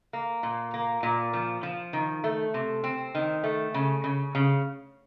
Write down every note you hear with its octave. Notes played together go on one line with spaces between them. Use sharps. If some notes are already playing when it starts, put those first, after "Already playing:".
A#3
A#2
A#3
A#2
F3
F3
D#3
A3
C3
C4
D#3
A3
C#3
C#3
C#3